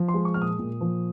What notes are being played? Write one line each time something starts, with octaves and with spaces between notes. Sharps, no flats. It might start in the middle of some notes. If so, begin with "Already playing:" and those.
Already playing: F3
C6
G#3
C#6
A#2 F6
D#6
A#2
F3